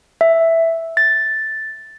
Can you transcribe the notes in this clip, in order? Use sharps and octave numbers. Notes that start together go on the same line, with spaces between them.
E5
A6